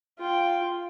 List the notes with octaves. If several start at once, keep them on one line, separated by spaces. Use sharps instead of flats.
F4 G5